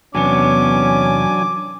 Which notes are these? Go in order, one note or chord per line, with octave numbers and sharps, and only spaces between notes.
E2 C3 F#3 B3 C#4 D4 G#5 D6